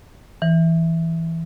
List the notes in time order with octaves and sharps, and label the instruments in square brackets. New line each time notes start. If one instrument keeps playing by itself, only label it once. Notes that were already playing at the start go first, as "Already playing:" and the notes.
[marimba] E3